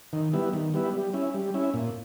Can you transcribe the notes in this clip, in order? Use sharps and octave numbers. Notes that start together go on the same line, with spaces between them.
D#3
G3 B3 E4
D#3
G3 B3 E4
G3
C#4 E4
G3
C#4 E4
A#2